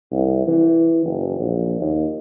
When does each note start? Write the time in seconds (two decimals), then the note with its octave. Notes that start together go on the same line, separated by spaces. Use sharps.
0.12 C2
0.47 E3
1.05 F#1
1.39 A#1
1.81 D#2